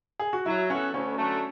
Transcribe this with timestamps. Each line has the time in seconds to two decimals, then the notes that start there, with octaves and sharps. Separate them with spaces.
0.19 G#4
0.33 F#4
0.46 F#3 E4
0.70 B3 C#4 F#4 A4
0.93 D2 C#4
1.17 D3 F#3 A3